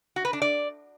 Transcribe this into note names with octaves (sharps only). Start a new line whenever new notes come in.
F#4
B4
D4
D5